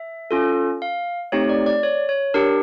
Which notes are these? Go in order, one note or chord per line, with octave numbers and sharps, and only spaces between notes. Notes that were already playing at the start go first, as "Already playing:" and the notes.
Already playing: E5
C#4 F4 A4
F5
A3 C4 D#4 G4 C#5
D5
D5
C#5
C#5
D4 G4 A#4